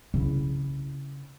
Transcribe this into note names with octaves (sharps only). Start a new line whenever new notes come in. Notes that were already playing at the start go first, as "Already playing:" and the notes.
C#3 E4